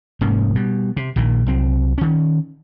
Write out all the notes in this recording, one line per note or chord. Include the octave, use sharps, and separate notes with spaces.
F1 G#2 A#3 C#4
B2 G3
C3
A#1 A#2 D#3
C2 F#3 C4
D#3 C#4